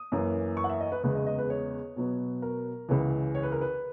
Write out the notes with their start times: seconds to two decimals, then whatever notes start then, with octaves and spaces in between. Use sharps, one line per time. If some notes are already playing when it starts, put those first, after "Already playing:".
Already playing: D#6
0.12 F#2 E3 A#3
0.57 C#6
0.64 F#5
0.70 E5
0.80 D#5
0.92 B4
1.03 E2 C#3 G#3 B3 B4
1.15 D#5
1.27 D#5
1.39 B4
1.50 C#5
1.96 B2 F#3 B3
2.42 A#4
2.89 C#2 C#3 E3
3.35 C#5
3.43 B4
3.52 A#4
3.61 B4